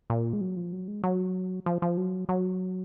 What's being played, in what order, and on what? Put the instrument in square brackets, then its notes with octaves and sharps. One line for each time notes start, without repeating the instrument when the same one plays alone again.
[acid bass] A#2
G#3
F#3
F3
F#3
G#3
F#3
F3
F3
F#3
F#3